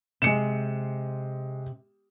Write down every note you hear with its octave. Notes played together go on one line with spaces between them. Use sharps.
C3 G#3 C#7 E7